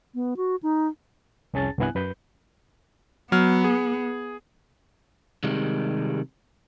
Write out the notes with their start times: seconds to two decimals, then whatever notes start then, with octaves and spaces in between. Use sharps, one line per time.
0.15 B3
0.37 F#4
0.63 D#4
1.54 C2 F2 C#4 G#4 A5 A6
1.79 C2 G2 B3 E4 G#5 F#6
1.95 F#2 B4 G6
3.32 F#3 B3 F6
3.64 G#4
5.44 C3 D#3 G3 G#3